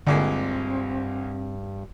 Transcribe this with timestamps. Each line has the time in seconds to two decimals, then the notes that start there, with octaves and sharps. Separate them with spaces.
0.07 C2 G2 A#2 D3 G#3 C4